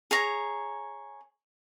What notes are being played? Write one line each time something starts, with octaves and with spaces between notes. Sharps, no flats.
G#4 C#5 A#5